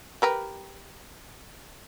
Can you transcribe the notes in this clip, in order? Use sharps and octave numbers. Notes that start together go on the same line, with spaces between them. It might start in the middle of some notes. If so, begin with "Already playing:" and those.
G4 A#4 B4